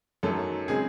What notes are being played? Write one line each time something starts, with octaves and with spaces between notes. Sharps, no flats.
F#2 D#3 F#3 A3 A4
C#3 G#3 C4 G#4